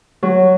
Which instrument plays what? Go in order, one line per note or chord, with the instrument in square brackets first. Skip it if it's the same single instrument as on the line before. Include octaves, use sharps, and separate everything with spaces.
[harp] F#3